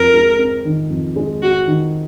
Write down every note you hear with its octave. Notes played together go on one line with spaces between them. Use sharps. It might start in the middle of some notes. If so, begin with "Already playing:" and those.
Already playing: F2 A#4
G#3
C4
D#3
F2
G#3
C4 F#4
D#3